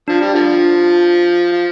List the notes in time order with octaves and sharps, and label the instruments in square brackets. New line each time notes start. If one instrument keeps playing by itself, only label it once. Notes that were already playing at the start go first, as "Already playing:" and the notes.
[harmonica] F3 [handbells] D4
[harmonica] G3
D3 F3
F3